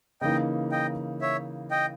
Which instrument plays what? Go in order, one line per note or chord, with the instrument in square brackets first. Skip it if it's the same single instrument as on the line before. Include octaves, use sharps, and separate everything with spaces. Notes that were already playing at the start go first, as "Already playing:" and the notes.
[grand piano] C#3 E3 A#3 D#4 [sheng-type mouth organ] D#5 G5
[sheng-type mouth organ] D#5 G5
C#5 E5
D#5 G5